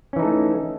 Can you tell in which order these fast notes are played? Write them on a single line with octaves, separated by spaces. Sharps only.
C#4 E3 D#4 A4 A3